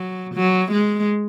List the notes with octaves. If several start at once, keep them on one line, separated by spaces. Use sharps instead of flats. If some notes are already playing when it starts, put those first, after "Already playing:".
Already playing: F#3
F#3
G#3